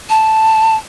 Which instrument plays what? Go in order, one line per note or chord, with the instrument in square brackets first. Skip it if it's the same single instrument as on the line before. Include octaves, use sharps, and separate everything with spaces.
[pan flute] A5